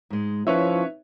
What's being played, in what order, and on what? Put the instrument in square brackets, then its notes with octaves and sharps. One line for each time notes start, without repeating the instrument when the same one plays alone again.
[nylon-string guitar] G#2 G#3
[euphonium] F3 [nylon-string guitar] C#4 D#4 [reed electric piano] E4 C#6 [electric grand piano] B4 C#5 E5